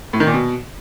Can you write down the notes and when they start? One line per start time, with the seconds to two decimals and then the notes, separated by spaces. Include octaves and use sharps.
0.13 A2
0.20 D#3
0.27 A#2
0.34 B2